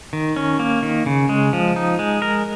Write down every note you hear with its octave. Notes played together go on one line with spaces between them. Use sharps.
D#3
C#4
A#3
D#3
C#3
G#3
F3
D#4
G#3
A#4